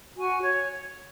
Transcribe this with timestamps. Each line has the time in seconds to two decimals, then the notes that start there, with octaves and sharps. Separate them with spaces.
0.17 F#4 G#5
0.43 C#5